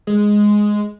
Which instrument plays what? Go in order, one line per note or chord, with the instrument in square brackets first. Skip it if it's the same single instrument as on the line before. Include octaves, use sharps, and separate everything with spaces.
[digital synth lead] G#3